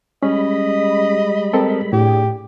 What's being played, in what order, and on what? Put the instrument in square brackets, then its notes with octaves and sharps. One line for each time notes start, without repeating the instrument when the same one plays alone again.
[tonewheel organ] G3 G#3 B5 [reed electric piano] C#4 [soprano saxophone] D#5
[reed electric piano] C4 A4 A#4
[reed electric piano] A2 [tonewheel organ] D4 G#4 [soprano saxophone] G4